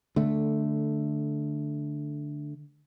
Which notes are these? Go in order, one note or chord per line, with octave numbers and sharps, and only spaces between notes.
D3 A3